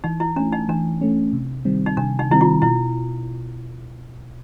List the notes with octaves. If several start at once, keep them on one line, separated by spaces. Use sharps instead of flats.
E3 D#4
E4
A3 C#4 D4
D#4
E3 D4
A3 C#4
C3
D#3 G3 C4
D#4
C3 D4
D#4
D#3 G3 C4 E4
F4
B2 E4